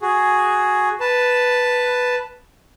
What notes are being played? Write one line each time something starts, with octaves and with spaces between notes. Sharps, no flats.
F#4 G#4
B4 A5